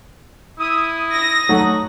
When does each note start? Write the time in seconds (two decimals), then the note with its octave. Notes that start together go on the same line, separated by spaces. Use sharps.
0.59 E4 D#6
1.13 A#6
1.49 F#3 A3 D#4 F#4